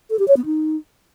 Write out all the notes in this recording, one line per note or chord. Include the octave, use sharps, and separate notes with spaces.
A4
G4
C#5
B3
D#4